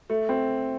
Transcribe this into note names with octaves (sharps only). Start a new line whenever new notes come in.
A3
C4